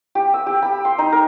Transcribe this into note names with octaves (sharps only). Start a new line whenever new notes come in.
G4
E6
G4
B5
C6
D#4
A#4